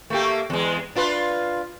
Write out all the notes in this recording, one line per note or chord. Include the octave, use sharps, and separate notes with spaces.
A3 A#3 G4
E2 G#3
D4 F4 B4